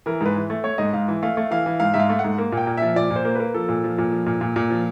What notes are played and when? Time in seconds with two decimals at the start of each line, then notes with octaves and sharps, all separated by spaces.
0.06 E3 A#4
0.21 G#2 B4
0.36 E3
0.50 A3
0.64 A3 C#5
0.78 G#2 D#5
0.93 G#2 F5
1.08 E3
1.23 A3 F5
1.37 A3
1.51 E3 F5
1.66 E3
1.80 G#2 F5
1.94 G#2 E5
2.00 F5
2.09 A3
2.19 F#5
2.24 G#2
2.38 A#3
2.52 A#2
2.57 G5
2.67 A#2
2.77 F3 E5
2.96 A#2 D5
3.10 A#2
3.16 C5
3.25 A#3
3.35 A#3 B4
3.54 F3 A4
3.69 A#2
3.84 F3
3.98 A#2
4.12 F3
4.26 A#2
4.41 A#2
4.56 A#2
4.70 F3